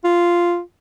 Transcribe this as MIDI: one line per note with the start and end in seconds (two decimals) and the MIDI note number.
0.04 0.60 65